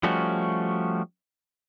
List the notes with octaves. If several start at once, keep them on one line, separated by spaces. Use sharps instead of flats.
F3 G3 A3 C#4 F#4